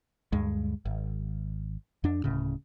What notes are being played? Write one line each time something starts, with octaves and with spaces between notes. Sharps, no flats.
D2 G2 G#3
G#1
F2 D4
D1 A2 C#3